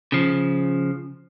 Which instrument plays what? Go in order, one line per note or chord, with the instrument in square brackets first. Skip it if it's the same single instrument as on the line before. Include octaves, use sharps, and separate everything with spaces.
[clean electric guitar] C#3 F3